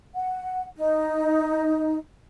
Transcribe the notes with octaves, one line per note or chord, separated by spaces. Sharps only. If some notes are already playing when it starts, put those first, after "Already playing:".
F#5
D#4